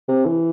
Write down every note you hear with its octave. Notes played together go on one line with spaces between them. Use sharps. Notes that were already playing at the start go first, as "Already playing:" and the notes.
C3
E3